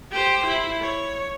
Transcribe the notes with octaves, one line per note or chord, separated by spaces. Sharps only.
G4 C5
E4
C#5